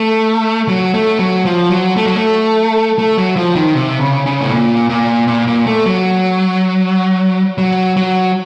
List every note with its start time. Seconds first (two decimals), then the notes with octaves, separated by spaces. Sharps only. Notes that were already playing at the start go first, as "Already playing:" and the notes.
Already playing: A3
0.68 F#3
0.94 A3
1.19 F#3
1.45 F3
1.71 F#3
1.96 A3
2.06 F#3
2.15 A3
2.98 A3
3.18 F#3
3.36 F3
3.55 D#3
3.75 C3
4.00 C#3
4.26 C#3
4.40 A2
4.52 A#2
4.89 A#2
5.28 A#2
5.47 A#2
5.66 A3
5.86 F#3
7.58 F#3
7.97 F#3